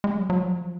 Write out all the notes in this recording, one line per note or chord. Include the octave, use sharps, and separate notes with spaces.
G#3
F#3
F#3
F3